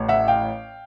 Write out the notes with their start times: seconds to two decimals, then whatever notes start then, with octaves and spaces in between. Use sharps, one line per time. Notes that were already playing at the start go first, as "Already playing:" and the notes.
Already playing: A1 A2
0.08 E5 F#5
0.28 F5 G5